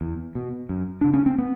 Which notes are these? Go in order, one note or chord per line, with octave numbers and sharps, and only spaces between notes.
E2
B2
F#2
C#3 D4
C#4
C4
B3